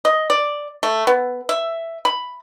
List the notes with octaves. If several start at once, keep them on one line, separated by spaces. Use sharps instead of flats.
D#5
D5
A3
B3
E5
B5